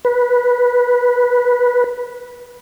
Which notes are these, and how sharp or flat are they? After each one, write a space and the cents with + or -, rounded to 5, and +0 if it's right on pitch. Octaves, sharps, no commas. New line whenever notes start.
B4 -15